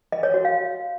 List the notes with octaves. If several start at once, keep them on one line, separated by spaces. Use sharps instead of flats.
D#5
C#5
F#4
F5